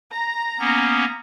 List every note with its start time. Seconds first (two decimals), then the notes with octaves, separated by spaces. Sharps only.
0.12 A#5
0.59 A#3 B3 C#4